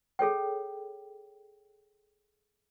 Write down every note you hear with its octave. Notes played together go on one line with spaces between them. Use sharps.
G#4 A4 C#5 G5